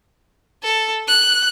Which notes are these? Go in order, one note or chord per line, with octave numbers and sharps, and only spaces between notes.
A4
F#6